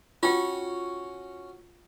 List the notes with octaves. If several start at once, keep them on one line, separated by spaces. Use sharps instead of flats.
C#4 F4 F#4 C#5 G5